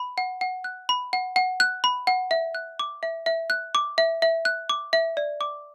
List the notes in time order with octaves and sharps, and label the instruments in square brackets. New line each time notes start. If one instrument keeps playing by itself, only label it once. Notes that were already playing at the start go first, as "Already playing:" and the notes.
Already playing: [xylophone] B5
F#5
F#5
F#6
B5
F#5
F#5
F#6
B5
F#5
E5
F#6
D6
E5
E5
F#6
D6
E5
E5
F#6
D6
E5
D5
D6